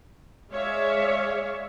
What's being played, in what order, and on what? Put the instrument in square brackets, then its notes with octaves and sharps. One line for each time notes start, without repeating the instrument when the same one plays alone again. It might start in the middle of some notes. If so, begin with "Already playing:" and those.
[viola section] G#3 C#5 D5 E5 F5